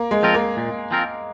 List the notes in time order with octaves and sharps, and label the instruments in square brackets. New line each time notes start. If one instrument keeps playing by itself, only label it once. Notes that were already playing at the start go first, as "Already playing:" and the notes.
Already playing: [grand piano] A#3
G#3
[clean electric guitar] F3 C4 F4 A#4
[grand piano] A#3
[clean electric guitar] A#2
F3 C4 F4 A#4